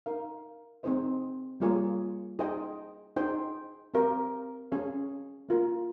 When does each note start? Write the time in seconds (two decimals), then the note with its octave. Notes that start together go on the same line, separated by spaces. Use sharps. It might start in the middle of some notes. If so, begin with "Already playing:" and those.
0.06 D#4 A#4 F5
0.83 C4 D#4 G#4 C5 D#5
1.60 G3 A#3 F4 G#4 C#5
2.39 D#4 G#4 C5 D#5 G5
3.16 D#4 G#4 C5 G5
3.94 C4 G4 A#4 F5
4.72 C#4 G#4 C#5 F5
5.49 A#3 F4 A#4